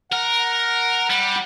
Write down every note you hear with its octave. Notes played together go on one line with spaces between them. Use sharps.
A#4 F#5
G3